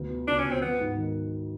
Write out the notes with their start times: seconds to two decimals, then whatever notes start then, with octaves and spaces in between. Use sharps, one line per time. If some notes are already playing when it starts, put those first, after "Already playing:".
Already playing: D2 B3
0.10 B2
0.26 C#2 D4
0.38 C#4
0.44 B2
0.51 C4
0.62 F#3 B3
0.79 G#2
0.97 D#3